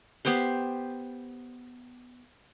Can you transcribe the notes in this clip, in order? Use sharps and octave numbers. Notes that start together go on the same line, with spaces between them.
B3 G4 C5 C6